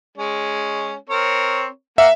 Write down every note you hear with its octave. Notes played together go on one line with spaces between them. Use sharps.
G#3 C#4
C4 A#4 C#5
A#3 E5 F#5